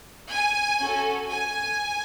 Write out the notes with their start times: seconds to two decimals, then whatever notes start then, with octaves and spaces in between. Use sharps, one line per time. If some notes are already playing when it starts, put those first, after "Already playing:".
0.32 G#5
0.81 C#4 F#4 A4
1.29 G#5